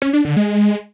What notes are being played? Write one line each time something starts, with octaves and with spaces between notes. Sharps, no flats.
C#4
D4
D3
G#3